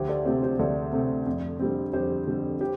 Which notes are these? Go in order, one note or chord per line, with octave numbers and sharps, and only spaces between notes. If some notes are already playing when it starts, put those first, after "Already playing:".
Already playing: D2 G4 C5
A4 D5
C3 A3 C4 G4 C5
G4 C5
D2 A4 D5
C3 A3 C4
F2
D3 G3 C4
F2 G4 C5
D3 G3 C4
G4 C5